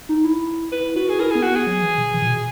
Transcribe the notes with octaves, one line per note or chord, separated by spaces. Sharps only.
D#4
E4
E4 B4
F#4 B4
G#4
E4 A#4
B3 G#4
F#4
B3 G#4
F#3
E3
B2
E3
A#2
B2